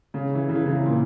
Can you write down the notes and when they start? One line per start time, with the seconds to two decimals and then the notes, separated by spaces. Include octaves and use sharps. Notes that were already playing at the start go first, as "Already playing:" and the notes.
0.14 C#3
0.35 E3
0.49 C#3
0.55 E3
0.66 C#3
0.76 C3
0.86 A#2